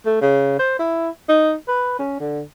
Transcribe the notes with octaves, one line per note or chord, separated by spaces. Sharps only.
A3
C#3
C5
E4
D#4
B4
C#4
D3